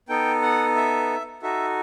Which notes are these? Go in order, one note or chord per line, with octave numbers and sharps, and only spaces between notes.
B3 D#4 A4 G5
F#5
E5
D#4 F#4 A4 E5